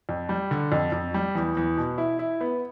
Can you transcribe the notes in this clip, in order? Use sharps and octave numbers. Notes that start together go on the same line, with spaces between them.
F2
G3
D3
F2
F2
G3
E2
E2
B2
E4
E4
B3